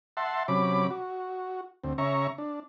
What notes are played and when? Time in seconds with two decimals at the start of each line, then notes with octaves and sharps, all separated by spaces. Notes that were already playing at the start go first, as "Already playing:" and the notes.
0.17 E5 F#5 A5 C6
0.48 C3 F#3 C#4 B5 D6
0.90 F#4
1.84 D2 C4
1.98 C#3 C#4 E5 A#5 C#6
2.38 D4